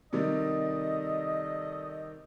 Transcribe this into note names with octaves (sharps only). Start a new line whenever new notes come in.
C3 D#3 G3 A4 D5 D#5